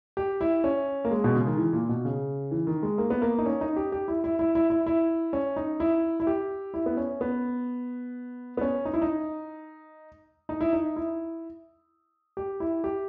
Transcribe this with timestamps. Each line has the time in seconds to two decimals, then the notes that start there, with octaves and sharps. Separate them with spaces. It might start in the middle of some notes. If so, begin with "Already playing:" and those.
0.17 G4
0.41 E4
0.64 C#4
1.05 A#3
1.11 G#3
1.24 B2
1.35 C#3
1.47 D#3
1.57 E3
1.73 A#2
1.89 B2
2.05 C#3
2.51 E3
2.67 D#3
2.83 G#3
2.98 A#3
3.10 B3
3.22 A#3
3.38 D#4
3.46 C#4
3.61 D#4
3.76 G4
3.92 G4
4.08 E4
4.24 E4
4.39 E4
4.55 E4
4.70 E4
4.86 E4
5.33 C#4
5.56 D#4
5.80 E4
6.20 E4
6.27 G4
6.74 E4
6.86 B3
6.97 C#4
7.21 B3
8.57 B3
8.61 C#4
8.85 D#4
8.94 E4
9.02 D#4
10.49 D#4
10.61 E4
10.73 D#4
10.96 E4
12.37 G4
12.60 E4
12.84 G4